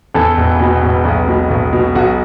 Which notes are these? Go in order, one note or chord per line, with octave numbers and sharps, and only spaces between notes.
E2 A4
E1
B2
E1
B1
B2
B1
B2
B1 F#4